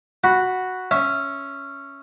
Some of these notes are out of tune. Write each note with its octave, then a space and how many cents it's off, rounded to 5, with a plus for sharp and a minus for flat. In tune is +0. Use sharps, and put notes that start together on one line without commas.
F#4 +0 B5 -5
C#4 +0 E5 +0